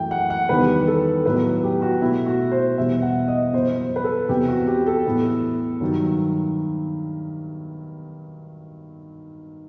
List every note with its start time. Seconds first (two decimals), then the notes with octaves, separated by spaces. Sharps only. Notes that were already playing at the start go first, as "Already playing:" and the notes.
Already playing: F#2 E3 A3 G5
0.11 F#5
0.30 F#5
0.49 E2 D#3 G3 B3 B4
0.87 A4
1.26 A2 F#3 B3 B4
1.63 G4
1.82 F#4
2.01 B2 A3 E4
2.26 F#4
2.51 C5
2.77 E2 B2 G3 B3 E5
3.02 F#5
3.28 D#5
3.53 F#2 E3 G3 B3 C5
3.96 B4
4.04 A4
4.29 E2 C3 E3 B3 G4
4.48 F#4
4.67 G4
4.87 A4
5.06 A2 E3 B3
5.81 G2 D#3 F#3